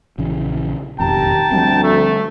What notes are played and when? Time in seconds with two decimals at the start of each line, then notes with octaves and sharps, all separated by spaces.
0.18 A#1 C#3 E3
1.00 E1 A1 F2 D#3 G4 G5 A5 A#5
1.51 D2 F3 G3 C4
1.84 A3